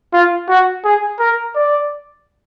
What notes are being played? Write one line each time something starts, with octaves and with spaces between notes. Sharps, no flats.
F4
F#4
G#4
A#4
D5